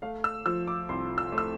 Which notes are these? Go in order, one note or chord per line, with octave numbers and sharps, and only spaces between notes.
A3 F5
E6
F3 E6
D6
C2 C6
E6
A3
E6